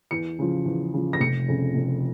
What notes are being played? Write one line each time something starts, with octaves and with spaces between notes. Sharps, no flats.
E2 C#7
C#3 F3
E2
C#3 F3
A#6
F1 C#7
F2 C#3
F1